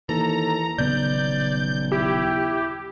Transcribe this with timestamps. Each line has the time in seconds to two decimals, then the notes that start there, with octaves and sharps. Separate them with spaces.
0.09 D#2 E3 A4 A#5
0.78 D#1 B1 C#3 B3 D5 G6
1.92 E4 G4